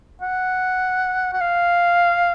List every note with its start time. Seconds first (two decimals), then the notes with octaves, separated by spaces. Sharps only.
0.22 F#5
1.33 F#5
1.41 F5